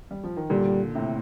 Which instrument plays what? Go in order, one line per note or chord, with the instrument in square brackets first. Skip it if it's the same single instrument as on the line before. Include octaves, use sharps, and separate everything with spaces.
[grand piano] G3
F3
D#3
[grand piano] A#2 D3 [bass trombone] G3
[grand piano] A2 C3